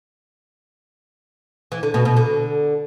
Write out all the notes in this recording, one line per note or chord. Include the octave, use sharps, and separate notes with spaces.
E3
D3
B2
B2
D3